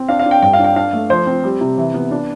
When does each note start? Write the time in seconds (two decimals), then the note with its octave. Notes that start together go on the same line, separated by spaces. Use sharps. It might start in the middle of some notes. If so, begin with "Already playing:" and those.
Already playing: C4
0.09 D4 F5
0.19 F5
0.26 D4
0.31 G5
0.42 G2 G5
0.53 F5
0.59 D4
0.64 G5
0.76 D4 F5
0.93 A3
1.10 F3 C5
1.27 C4
1.44 G3
1.61 C3
1.77 E3
1.94 B3
2.11 D4